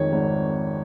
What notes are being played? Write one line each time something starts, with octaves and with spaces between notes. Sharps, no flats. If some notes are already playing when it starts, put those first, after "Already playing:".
Already playing: F2 D#3 G#3 C#5
G#1